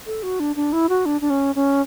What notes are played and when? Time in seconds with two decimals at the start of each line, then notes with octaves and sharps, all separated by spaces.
0.06 A4
0.23 F#4
0.40 D4
0.56 D4
0.73 E4
0.89 F#4
1.06 D4
1.21 D4
1.30 C#4
1.55 C#4